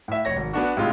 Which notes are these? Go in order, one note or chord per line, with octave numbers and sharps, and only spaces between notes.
A2 E5
F1 C#5 A#6
G#1
B3 D4 F#4
A2 C3 G#3 F4